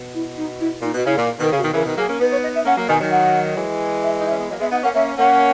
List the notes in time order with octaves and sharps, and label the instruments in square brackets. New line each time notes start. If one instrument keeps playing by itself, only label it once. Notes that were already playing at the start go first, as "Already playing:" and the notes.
Already playing: [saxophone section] B2
[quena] E4
D#4
E4
[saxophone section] A#2 [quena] D#4
[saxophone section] B2
[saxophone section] C#3 [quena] E4
[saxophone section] A#2
[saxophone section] B2 D#3 [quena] A#4
[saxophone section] C#3
[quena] F#4
[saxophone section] B2 D#3
[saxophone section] C#3 E3 [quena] A#4
[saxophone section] B2 D#3
[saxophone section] F#3 A#3 [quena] G#4
[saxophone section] A#3 C#4
[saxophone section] B3 D#4 [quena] B4
[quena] C#5
D#5
E5
[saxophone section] A#3 C#4 [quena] F#5
[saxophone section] F#3 A#3
[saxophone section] B2 D#3 [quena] G#5
[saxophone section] D#3 F#3
[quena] F#5
[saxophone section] E3 G#3
[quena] E5
[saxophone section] D#4
[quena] E5
[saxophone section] C#4
B3
[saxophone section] F#3 A#3 [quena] D#5
[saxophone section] G#3 B3 [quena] E5
[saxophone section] B3 D#4 [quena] F#5
[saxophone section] A#3 C#4 [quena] F#5
[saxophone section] A#3 C#4 [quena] E5
[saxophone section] A#3 C#4 [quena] F#5